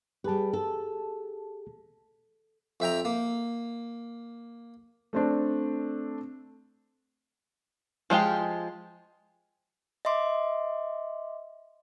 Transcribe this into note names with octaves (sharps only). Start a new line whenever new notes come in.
G3 G4 G#4 B4 A5
A4
F2 E5 G5 A#5
A#3
A3 C4 D4
F3 G#3 F4 G4
D#5 E5 C6 D6